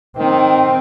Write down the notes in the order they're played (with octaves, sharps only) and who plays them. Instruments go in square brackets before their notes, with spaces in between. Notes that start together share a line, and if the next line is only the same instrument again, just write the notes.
[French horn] D#3 [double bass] C4